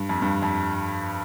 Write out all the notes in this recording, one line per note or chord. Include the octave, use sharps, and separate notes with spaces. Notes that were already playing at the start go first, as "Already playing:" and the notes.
Already playing: G2
F2
G2
F2